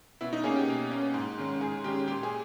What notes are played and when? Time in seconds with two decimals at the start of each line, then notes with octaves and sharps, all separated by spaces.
0.21 B2 E4
0.33 D#4
0.44 A#3 C#4 G#4
0.56 G4
0.68 B2
0.91 A#3 C#4
1.14 G#2
1.38 D#3 G#3 C#4
1.61 G#2 G#4
1.84 D#3 G#3 C#4 G4
2.07 A#2 G4
2.23 G#4